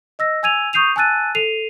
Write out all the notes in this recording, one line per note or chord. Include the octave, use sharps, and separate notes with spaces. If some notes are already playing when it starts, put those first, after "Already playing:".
D#5 E6 A#6
G#5 E6 G#6 D#7 F7
C#6 D#6 G6 C7 D#7 F7
G#5 A5 E6 F#6 A6 D#7
A4 C7 D#7 F7